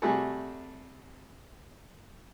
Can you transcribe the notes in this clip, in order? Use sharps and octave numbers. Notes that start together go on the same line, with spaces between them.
C3 G3 A3 F#4 G#4 A4